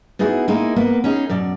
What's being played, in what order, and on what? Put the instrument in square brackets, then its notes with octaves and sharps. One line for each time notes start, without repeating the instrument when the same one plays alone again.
[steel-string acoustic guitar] B3 D#4 E4 F#4 G#4
G#3 A#3 D#4 E4
A#3 B3
C#4 D#4 G#4
F#2 B2 D5